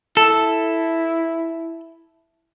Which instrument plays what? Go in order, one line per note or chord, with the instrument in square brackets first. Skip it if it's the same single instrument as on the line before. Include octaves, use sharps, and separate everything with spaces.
[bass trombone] E4 [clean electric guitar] A4